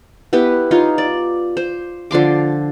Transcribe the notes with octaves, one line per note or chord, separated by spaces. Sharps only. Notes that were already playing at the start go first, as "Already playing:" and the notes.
B3 E4 G4 B4
D#4 F4 C#5
D5
C5
D3 F3 C6 D6